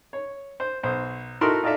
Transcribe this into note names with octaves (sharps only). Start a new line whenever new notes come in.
C#5
C5
B1 C5
D#4 E4 F#4 A4 A#4 C6
D#4 F4 A4 A#4 D5 E5